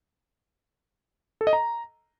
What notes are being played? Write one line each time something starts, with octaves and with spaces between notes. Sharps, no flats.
A4
D#5
A#5